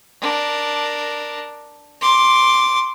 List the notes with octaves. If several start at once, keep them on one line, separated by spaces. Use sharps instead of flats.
D4 A#4
C6 D6